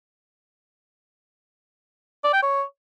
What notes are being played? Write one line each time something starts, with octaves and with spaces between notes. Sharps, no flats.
D5
G5
C#5